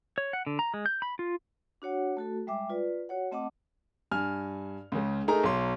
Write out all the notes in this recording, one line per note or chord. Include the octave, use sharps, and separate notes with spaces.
C#5
F#5
D3
A#5
G#3
G6
B5
F4
D4 F#4 C#5 F#5
A3 F#4 A4
G3 G#3 E5 G5 D6
F4 B4 D5
F#4 C#5 F#5
A3 C4 D#5 F#5 A5 D6
G2 G#5 F6
C#2 C#3
A3 D#4 G#4 A#4 A#5
B1 C6